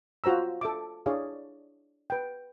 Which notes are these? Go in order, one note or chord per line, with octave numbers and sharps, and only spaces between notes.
F4 F#4 C5 A#5 E6
A4 E5 D6
D4 E4 G#4 C#5 D5 F5
B4 G5